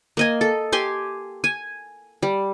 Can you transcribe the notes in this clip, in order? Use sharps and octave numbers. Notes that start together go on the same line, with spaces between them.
A#3 D#5 G#5
A4
G4 G#5 C6
G#5
G3